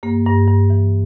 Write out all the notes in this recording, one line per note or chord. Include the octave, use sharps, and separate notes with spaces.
G2 A#3
G2
G2
E3